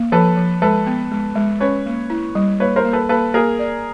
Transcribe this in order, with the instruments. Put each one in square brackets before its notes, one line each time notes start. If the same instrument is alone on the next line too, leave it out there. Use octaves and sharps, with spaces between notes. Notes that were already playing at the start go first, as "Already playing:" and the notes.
Already playing: [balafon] A#3
[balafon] F3 [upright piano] A4 B4
[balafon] F3
[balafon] G#3 [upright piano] A4 B4
[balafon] B3
G#3
G#3
[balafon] C#4 [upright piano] B4 C#5
[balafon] A#3
E4
G3
[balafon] A#3 [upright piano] B4 C#5
[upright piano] A#4 C5
[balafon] A#3
[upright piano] A4 B4
[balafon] A#3 [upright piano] A4 B4
[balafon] A#3 [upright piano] G#4 A#4
[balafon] D5